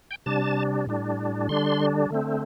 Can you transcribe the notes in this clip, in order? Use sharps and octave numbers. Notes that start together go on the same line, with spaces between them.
G5
C3 G3 D4 A5
A2 G3 D4
D3 G3 D4 C6
D3 A3 C4